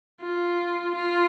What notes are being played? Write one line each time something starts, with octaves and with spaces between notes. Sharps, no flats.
F4
F4